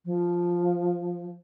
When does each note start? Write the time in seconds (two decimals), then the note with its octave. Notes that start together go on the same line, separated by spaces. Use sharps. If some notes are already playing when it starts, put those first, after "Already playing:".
0.05 F3